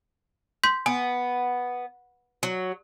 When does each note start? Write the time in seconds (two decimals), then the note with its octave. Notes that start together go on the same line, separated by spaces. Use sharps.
0.64 C6 G6 B6
0.86 B3 G#5
2.43 F#3